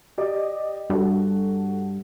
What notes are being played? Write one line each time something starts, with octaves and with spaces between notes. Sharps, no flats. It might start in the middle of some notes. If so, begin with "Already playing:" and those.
G4 D5 D#5
G2 F#4 A4